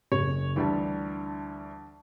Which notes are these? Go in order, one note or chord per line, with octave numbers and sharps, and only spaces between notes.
F#1 C#5
D2 E3 G3 D4 A5